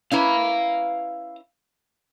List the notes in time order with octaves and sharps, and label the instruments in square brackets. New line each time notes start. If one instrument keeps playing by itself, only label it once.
[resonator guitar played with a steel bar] C#4 E4 B4 [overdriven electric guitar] F5 A#5